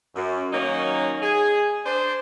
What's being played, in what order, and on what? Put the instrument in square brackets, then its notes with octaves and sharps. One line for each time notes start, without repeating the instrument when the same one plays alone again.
[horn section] F#2
D#3 F#3 A#3 C#4 D#4
G#4
D4 C5